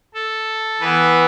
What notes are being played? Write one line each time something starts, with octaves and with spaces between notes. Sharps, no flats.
A4
E3 B3 E4 B4